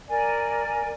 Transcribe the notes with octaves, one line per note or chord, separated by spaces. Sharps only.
A#4 D5 G#5